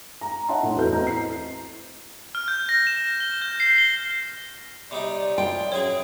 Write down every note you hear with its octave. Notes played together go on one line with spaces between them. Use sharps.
A#5
C#5 D#5 E5 F#5 A5 C6
A2
E2 F#4 A4 B4 G6
C4 C5 D#5 A#5
E4 C7
F6
G6
A#6
E7
G7
G6
C7
G7
C3 G3 D#4 C#5 D5
F4 G5
F#2 B2 C#4 G#4 C#5 G#5